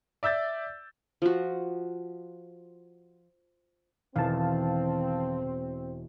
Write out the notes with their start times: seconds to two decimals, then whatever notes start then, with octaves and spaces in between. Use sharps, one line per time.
0.23 D5 E5 E6 G6 A6
1.22 F3 F#4
4.16 E1 D#3 E3 C4 F5 A5